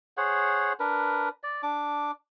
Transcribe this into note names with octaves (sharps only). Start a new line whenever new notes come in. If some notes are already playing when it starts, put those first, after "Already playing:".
G#4 C5 C#5 F#5
D4 A#4 B4
D5
D4 D6